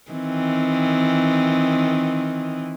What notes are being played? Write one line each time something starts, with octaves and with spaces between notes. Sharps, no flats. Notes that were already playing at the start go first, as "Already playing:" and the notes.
D#3 E3 C4